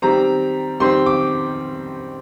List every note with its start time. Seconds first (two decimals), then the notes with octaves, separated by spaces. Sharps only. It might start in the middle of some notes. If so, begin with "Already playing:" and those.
0.02 D#3 G3 C4 A#5
0.80 D#3 G3 C4 C6
1.06 D6